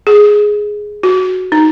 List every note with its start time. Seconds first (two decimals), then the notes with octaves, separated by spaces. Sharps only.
0.07 G#4
1.03 F#4
1.52 D#4